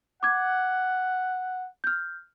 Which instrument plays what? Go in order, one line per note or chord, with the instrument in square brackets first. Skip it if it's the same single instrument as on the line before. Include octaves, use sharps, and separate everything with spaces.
[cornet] F#5 [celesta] D6 G#6
[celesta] F6 G6